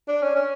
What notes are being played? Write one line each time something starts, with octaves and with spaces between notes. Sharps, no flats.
D4
C#4
C#4